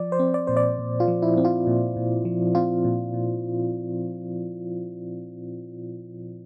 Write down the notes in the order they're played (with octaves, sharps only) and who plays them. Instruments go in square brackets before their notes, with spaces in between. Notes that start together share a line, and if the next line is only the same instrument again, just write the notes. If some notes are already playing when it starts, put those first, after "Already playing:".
Already playing: [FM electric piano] F3 D5
C5
C4
D5
A#2 C5
D5
A#2
F4
F3
E4
C4
F4
A#2
A#2
F3
C4 F4
A#2
A#2